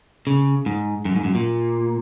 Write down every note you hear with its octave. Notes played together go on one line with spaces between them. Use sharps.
C#3
G#2
F#2
G#2
F#2
A#2